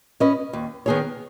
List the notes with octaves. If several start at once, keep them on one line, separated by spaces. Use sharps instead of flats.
C#4 B4 D#5
D#2
D#3 B3 G#4 C#5